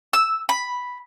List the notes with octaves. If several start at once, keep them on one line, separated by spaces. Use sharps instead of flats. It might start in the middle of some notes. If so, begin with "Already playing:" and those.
E6
B5